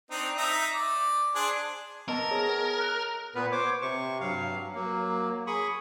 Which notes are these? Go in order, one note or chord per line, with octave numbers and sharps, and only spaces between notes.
C4 D4 D#4
D#4 E5 A#5
D5
D4 G#4 C5
B3 A#4 D#5 A5
G#4 C#5
A#5 F6 F#6
A#2 B3 B4
C5 C#5 D6
C3 C#6
G2 F#3 F5
F#3 A#3
G#4 B5 C#6 D#6